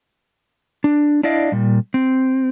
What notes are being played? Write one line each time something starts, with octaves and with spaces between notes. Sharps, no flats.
D4
D4 E4 D5 D#5 F5
A#2 G3
C4